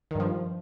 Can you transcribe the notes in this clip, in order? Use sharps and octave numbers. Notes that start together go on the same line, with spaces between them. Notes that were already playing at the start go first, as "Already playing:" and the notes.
G2 D#3 F3